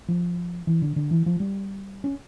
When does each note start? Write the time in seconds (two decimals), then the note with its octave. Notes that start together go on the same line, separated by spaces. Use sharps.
0.08 F3
0.67 E3
0.82 D3
0.96 D3
1.11 E3
1.26 F3
1.40 G3
2.04 C#4